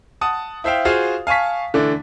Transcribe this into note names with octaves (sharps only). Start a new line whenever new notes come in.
F#5 A5 D#6
E4 C5 E5 F5 G5
F4 F#4 G#4 C5 F5
F5 G#5 A5 C#6 B6
D3 E3 A3 D4